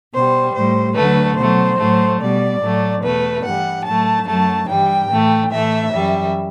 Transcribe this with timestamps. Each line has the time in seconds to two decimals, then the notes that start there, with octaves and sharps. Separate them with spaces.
0.13 B2 G3 C5
0.54 A2 G3 C5
0.95 D2 D3 F#3 A3 B4
1.36 B2 F#3 A3 C5
1.78 A2 F#3 A3
2.19 B2 G3 D5
2.61 A2 F#3 A3
3.02 E2 B2 A3 B4
3.43 G2 E3 G3 F#5
3.85 A2 F#3 A3 A5
4.27 F#2 F#3 A3 A5
4.68 G2 E3 G3 G5
5.09 A2 E3 A3
5.50 A2 E3 A3 E5
5.92 F#2 E3 G3